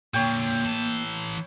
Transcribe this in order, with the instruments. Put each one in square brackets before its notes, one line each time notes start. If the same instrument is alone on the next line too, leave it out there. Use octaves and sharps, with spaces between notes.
[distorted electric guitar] A#2 D3 [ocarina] A#3 [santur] C#5 G5
[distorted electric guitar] E3 A4